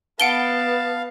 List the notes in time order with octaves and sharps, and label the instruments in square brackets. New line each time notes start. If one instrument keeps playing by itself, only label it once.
[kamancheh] B3 B4 [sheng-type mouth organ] F5 [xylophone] F#5 D7 G7 [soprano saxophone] A5